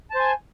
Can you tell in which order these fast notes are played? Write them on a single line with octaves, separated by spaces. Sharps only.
A5 C5 G#5